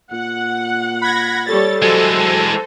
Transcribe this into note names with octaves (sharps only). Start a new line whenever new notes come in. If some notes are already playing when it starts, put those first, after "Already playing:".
A#2 F#5
B5 G#6 A#6
G3 A4 C#5 A6
E3 F#3 G#3 A4 C5